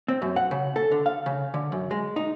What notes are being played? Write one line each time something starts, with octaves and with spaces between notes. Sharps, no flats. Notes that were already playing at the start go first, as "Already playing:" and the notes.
C4
F#2
F#5
C#3
A4
D3
F5
C#3
D3
F#2
G#3
D#4